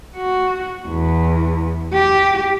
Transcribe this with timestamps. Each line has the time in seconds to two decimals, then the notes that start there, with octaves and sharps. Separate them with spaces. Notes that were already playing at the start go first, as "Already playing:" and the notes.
0.16 F#4
0.88 E2
1.93 G4